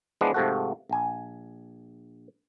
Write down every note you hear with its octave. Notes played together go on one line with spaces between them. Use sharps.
E3 F3 G#3 B3 D4
G#2 C3 F3 A3 F#4
A#1 G#5